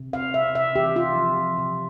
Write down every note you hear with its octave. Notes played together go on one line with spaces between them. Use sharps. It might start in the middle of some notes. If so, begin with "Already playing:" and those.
Already playing: C3
C4 F5
C3 E5
C3 E5
E3 G4
C3 F4
F3
F3
C3